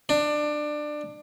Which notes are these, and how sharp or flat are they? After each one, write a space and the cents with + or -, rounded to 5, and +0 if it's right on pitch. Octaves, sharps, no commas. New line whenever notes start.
D4 +20